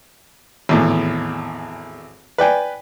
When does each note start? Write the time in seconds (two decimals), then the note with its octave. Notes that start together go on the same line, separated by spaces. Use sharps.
0.69 G#1 E2 A2
2.38 B4 D5 G5 G#5